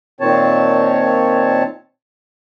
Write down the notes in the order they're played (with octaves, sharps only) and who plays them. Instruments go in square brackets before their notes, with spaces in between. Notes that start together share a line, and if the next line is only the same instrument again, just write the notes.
[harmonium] A#2 D#3 C4 C#5 A5